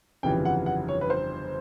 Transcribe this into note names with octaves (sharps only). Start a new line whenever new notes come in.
G1 F2 C#3 E3 G3 G5
F#5
F#5
C#5
B4
C5